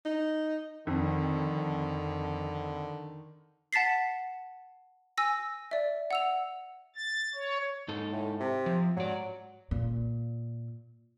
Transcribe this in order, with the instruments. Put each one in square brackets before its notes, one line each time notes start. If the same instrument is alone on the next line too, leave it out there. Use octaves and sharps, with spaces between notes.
[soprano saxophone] D#4
[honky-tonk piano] F2 [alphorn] D3 [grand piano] D#3
[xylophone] F#5 A5 A6 B6 C7
G#5 E6 A#6
D5 E5
F#5 E6 F7
[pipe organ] A6
C#5
[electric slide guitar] G#2 D#4 A4
[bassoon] A2
C3
[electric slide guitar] F3
[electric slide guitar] G#2 D5 [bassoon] F#3
[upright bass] A#2